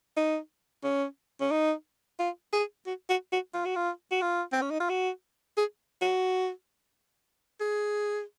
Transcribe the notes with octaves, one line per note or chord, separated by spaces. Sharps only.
D#4
C#4
C#4
D#4
F4
G#4
F#4
F#4
F#4
F4
F#4
F4
F#4
F4
C4
C#4
D#4
F4
F#4
G#4
F#4
G#4